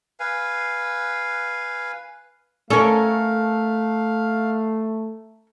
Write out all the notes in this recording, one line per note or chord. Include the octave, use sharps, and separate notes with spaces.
B4 F5 G#5
A3 C#4 A4 A#4 F5